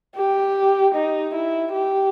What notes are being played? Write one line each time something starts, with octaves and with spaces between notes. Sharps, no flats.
G4
D#4
E4
G4